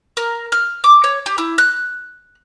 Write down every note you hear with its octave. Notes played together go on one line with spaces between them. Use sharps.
A#4
F6
D6
C#5
G4
E4
F#6